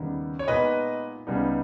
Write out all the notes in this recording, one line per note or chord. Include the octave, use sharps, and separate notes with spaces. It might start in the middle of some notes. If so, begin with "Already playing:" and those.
Already playing: D#2 C#3 G3 B3 D#4
C#5
A#2 G#3 B3 D#4 B4 D#5
C#2 C#3 G3 B3 D#4